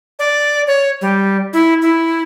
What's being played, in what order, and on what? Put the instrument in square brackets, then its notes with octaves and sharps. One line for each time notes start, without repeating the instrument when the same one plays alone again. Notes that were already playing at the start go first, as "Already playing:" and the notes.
[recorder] D5
C#5
G3
E4
E4